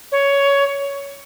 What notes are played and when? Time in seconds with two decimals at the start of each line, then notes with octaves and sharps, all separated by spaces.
0.11 C#5